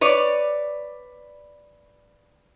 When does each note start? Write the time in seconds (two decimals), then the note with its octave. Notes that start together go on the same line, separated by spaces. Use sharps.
0.01 B4 C#5 D5